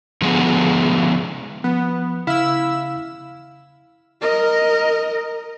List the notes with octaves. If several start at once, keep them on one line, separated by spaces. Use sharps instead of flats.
D3 F3 G#3 B3 G#4
F3 B3
C#3 E4 F5 E6 F6
A#4 D#5